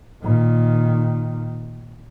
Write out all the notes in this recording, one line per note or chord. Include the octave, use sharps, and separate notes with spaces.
A#2 D#3